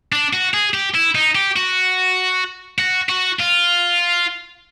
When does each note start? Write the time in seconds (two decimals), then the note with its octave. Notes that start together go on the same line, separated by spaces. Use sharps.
0.13 D4
0.33 F#4
0.54 G#4
0.74 G4
0.95 E4
1.15 D#4
1.35 G4
1.56 F#4
2.79 F#4
3.09 F#4
3.40 F4